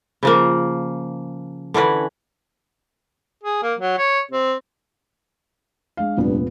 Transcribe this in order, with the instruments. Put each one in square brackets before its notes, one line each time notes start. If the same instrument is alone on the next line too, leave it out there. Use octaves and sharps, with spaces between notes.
[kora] C#3 F3 A#3
D3 E3 C#4 B4
[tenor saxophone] G#4
A#3
F#3
C#5
C4
[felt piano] G#3 D4 F5
[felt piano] F1 A#2 B3 [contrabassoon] G2